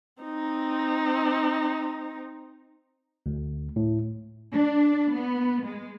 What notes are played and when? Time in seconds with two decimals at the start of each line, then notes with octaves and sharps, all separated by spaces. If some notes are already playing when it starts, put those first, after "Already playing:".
0.23 C4 D#4
3.26 D2
3.76 A2
4.53 D4
5.12 B3
5.64 G#3